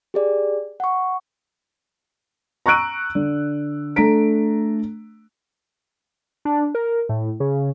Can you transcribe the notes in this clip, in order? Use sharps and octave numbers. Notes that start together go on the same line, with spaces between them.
G4 G#4 D5
F#5 C#6
A#5 C#6 E6 F#6 D7 D#7
D3
A3 D4 A4 A#5 B6 D7
D4
A#4
A2
C#3